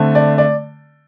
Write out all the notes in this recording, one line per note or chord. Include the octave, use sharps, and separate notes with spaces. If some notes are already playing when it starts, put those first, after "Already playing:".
Already playing: D3 A3 C4
D5
D5